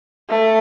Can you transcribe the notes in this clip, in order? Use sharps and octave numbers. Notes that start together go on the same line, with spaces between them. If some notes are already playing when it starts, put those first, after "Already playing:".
A3